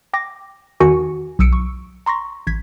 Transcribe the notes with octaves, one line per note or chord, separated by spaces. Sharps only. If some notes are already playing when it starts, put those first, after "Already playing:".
G5 D6 A#6
E2 D#3 F#4 G#5 C#7
B1 D#6 E6 C#7 D7
C#6
A#5 C6 C#6 A#6
A1 G#6 B6